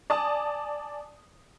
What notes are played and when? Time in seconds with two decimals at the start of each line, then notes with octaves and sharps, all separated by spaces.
0.10 D5 G#5 A5 D#6